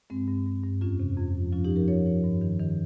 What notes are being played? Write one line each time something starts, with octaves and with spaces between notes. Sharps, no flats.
G2 G#3 C4
G2
G2
G2
F2 C#4 F4
C3
F2
F3
F3 C#4 F4
D#4 G4
F3
G4 A#4
F3 A#4 C#5
F3
G2
D#3
D#3